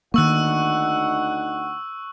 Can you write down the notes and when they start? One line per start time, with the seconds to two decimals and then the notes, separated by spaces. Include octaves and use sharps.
0.14 D2 D#3 A#3 D#4 F#5 C#6 E6 F#6